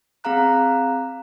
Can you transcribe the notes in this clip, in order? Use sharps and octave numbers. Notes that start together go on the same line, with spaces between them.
C4 G#4 F5 A#5 F#6